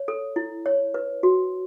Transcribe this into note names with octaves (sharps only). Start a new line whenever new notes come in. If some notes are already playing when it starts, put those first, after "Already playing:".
Already playing: C#5
A4
E4
C#5
B4
F#4